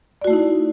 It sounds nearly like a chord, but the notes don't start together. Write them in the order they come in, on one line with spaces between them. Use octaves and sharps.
D5 F#4 A3 E4 D#4